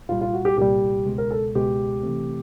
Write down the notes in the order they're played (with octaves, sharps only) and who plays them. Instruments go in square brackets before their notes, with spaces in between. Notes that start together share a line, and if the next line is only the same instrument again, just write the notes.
[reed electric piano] C2 A#2 G3 [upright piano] F4
[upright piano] F4
F#4
G4
[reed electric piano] C2 A#2 G3 [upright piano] G4
[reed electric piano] C#2 B2 G#3
[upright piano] A#4
A4
[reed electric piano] C#2 B2 G#3 [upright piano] G4
[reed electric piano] C3 E3 A3 C4